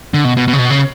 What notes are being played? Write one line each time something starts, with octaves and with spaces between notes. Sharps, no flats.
D3
B2
B2
B2
C#3
B2
C#3